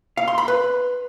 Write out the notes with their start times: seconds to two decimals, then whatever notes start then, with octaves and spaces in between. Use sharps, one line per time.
0.17 F5
0.28 C6
0.38 B5
0.48 B4